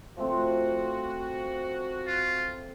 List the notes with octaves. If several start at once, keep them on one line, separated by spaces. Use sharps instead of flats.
F3 A3 C4 F#4
F4